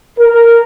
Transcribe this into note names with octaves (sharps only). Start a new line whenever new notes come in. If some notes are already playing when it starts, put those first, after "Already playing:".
A#4